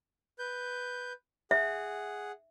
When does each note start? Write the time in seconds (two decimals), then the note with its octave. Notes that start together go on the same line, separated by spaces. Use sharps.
0.39 B4 G6
1.51 G#4 E5 F#5